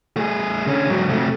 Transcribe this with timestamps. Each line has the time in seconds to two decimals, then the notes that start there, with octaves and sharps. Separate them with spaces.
0.17 A3 G#4
0.67 D3 C#4
0.90 G#2 F#3
1.09 C3 A3